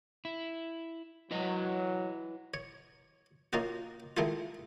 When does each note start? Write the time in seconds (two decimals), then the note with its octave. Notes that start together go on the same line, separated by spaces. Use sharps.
0.25 E4
1.31 F#3 E4 B4 D#5
2.54 C#5
3.53 A#3 C#4 D#4 F4 F#4
4.17 D#3 G#3 A3 E4 F4